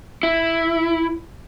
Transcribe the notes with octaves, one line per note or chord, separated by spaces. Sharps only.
E4